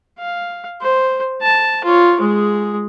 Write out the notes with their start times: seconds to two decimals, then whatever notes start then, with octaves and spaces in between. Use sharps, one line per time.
0.20 F5
0.81 C5
1.42 A5
1.84 F4 C#5
2.20 G#3 G#4